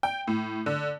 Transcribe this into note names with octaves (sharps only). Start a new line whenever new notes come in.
G5
A2
D3